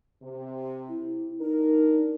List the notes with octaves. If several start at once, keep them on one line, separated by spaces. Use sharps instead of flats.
C3
E4
D4 D#4 A#4